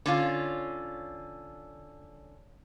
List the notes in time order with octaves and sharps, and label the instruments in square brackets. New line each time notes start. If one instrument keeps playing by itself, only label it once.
[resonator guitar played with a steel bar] D3 C#4 F4